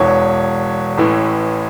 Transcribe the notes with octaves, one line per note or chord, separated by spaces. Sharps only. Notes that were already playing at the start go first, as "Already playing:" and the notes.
Already playing: E1 E2 E3 C#5
A1 A2 E3